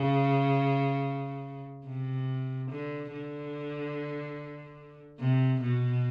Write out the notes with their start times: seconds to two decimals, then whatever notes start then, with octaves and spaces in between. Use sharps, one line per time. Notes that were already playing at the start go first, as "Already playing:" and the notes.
Already playing: C#3
1.86 C3
2.70 D3
3.12 D3
5.19 C3
5.61 B2